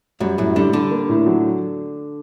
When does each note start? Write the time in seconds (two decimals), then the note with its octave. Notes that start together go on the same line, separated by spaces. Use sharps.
0.20 F#2 F#3 G3
0.38 F#2 A2 F#3
0.56 D3 G3 D4
0.73 D3 G3 D4
0.91 A#3
1.09 A2
1.26 F#3